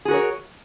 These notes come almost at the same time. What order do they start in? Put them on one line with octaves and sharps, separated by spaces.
G#4 F#4 A#4 C#5